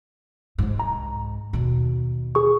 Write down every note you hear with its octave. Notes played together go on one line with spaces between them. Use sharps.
C2 G#2
A#5
D#2 B2
G#4 C#6